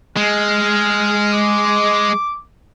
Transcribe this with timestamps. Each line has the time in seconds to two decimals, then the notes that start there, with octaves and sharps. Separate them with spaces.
0.17 G#3 F6
1.33 D6